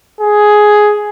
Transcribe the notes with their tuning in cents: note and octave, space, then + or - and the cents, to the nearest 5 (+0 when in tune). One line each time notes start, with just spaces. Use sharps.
G#4 +5